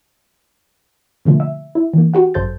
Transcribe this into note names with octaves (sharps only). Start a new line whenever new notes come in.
B2 D3 F3 A3 A#3
E5
E4
E3 A#3
F#4 G4 F#5
G#1 F#2 A4 C5 G6 A6